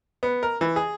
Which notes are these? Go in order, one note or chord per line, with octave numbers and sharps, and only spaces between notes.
B3
A#4
E3
G#4